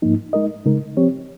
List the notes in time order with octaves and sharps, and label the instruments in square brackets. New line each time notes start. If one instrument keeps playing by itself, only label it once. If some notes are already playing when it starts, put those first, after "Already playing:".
[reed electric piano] G#2 F3 A#3 D#4
G#3 D#4 A#4 D#5
C#3 G#3 D#4 A#4
F3 C4 G4 C#5